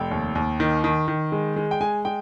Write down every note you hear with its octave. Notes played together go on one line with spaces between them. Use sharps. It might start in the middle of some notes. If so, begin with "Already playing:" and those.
Already playing: F1 G5
D#2
D#2
D#3
D#3
D#3
G#3
G#3
G5
G#3 G#5
G#3 G5